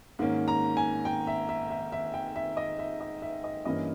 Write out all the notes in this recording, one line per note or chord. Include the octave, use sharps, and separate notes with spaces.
G#2 D#3 A#3 C#4
A#5
G#5
G5
E5
E5
E5
E5
G5
E5
D#5
E5
D#5
E5
D#5
G2 E3 A#3 C#4 D#5